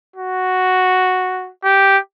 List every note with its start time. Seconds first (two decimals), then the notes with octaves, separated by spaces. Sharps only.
0.16 F#4
1.64 G4